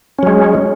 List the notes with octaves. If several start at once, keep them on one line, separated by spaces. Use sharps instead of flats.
F#3 G#3 C#4